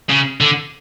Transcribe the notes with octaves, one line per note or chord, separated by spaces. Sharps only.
C#3
D3